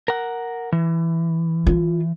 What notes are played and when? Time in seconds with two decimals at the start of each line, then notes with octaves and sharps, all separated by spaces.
0.08 A#4 F#5
0.72 E3
1.67 F4